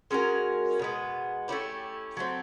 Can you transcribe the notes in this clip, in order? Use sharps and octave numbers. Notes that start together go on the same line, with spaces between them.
G#3 C#4 F#4 A#4
B2 G#3 B3
A3 C#4 E4 G4
F#3 A3 C4